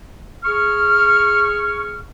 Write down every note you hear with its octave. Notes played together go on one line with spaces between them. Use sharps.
G#4 C#6 F6